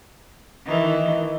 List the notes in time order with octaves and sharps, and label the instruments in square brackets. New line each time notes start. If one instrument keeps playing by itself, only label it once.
[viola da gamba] D#3 E3